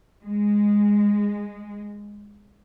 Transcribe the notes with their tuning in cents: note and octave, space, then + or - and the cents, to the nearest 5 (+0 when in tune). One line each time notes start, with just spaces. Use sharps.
G#3 -10